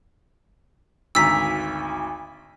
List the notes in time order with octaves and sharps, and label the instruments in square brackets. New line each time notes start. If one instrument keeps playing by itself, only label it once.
[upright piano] G#1 D2 A#5 [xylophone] E6 B6